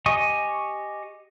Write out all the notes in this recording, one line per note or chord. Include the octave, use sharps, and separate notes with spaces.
G4 D#5 G#5 C#6 D#6